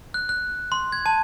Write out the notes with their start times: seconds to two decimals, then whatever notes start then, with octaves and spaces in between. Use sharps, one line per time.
0.14 F#6
0.29 F#6
0.72 C6
0.92 G#6
1.06 A5